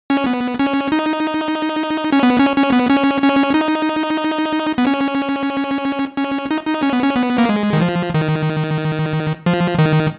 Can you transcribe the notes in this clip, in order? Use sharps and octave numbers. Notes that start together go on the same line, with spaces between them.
C#4
B3
C#4
D#4
C#4
B3
C#4
C#4
B3
C#4
C#4
D#4
B3
C#4
C#4
D#4
D#4
C#4
B3
C#4
B3
A#3
G#3
D#3
F3
D#3
F3
D#3